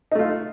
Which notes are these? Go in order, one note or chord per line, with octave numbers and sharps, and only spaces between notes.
A3 D#4 F4